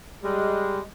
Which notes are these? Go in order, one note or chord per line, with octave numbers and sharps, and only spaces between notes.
G3 G#3